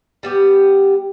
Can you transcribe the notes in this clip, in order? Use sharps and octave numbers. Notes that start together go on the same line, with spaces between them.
G3 B3 G4